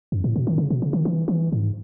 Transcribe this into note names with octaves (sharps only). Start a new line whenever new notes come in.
F#2
A2
B2
D#3
C#3
B2
C#3
D#3
E3
E3
G#2